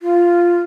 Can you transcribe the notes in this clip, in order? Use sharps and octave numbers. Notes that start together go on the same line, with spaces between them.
F4